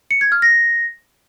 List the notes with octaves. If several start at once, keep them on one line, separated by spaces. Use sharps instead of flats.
C#7
G#6
F6
A#6